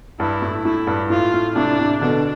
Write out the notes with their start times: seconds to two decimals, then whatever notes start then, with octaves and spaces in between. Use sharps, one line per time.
0.20 G2 E4
0.42 A2
0.65 A2 E4
0.87 G2
1.10 A2 F4
1.34 A2
1.55 A2 C3 D4
1.79 A2 C3
2.01 B2 D3 D4